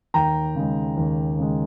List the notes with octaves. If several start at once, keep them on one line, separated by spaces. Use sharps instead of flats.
D#2 G5 A#5
C#3 G#3
D#2
C#3 G#3